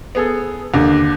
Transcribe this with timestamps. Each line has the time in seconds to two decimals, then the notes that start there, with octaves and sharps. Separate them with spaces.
0.15 B3 G#4 A4
0.74 D#2 D3